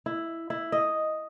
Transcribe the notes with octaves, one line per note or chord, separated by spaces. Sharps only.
E4
E4
D#5